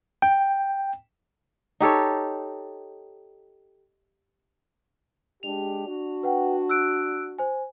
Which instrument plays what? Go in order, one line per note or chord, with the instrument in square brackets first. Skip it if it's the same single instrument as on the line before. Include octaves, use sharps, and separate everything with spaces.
[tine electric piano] G5
[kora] D#4 G4 A4 C#5
[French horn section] G#3 D4 G4 [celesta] F7
[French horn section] D4 F#4
[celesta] B4 F#5 G5
E6 F#6 D7
C5 G#5